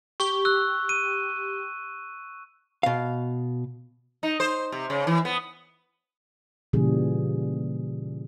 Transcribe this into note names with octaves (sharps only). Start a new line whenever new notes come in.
G4 C#6 G7
E6 F#6
D#7
B2 F5
D#4
C5
C3
C#3
E3
B3
A#2 C#3 E3 G3 G#4